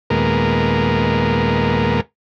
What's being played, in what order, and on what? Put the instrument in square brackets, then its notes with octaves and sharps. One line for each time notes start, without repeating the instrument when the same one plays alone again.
[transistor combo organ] D#2 A#2 G#3 B3 A#4